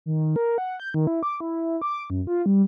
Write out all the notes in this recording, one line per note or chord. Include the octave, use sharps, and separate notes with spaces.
D#3
A#4
F#5
G6
D#3
E4
D6
E4
D6
F#2
F4
G3